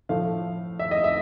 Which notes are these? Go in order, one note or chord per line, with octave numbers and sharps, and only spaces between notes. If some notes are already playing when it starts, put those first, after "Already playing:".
A2 F3 A3 F5
E5
D#5
E5